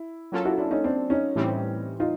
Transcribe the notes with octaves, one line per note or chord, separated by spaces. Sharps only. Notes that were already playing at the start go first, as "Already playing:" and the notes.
Already playing: E4
F#3 A#3 C#4 F4 A4
E4 F#4
D4 E4
C#4 D#4
C4 D4
C#4 D#4
A2 E3 G3 C4
D#4 F4